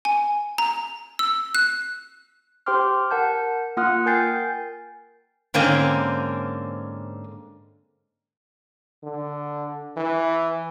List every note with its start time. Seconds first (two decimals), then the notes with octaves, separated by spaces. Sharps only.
0.05 G#5
0.58 A#5
1.19 E6
1.55 F#6
2.66 G4 C5 G5 C6 D6 F6
3.11 A#4 F#5 A5 G6
3.77 A#3 F4 F#5 D#6 F6 F#6
4.06 A#4 G5 G#5 G6 A6 C7
5.54 G#2 D3 A#3 C4 C#4
9.03 D3
9.97 E3